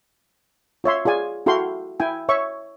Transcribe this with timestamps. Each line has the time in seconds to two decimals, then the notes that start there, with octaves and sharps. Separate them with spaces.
0.84 F4 C#5 E5 C6
1.06 F4 G#4 D5 G#5
1.46 E4 F#4 A4 F5 G5 C6
2.00 E4 G5 G#5
2.29 C#5 E5 C#6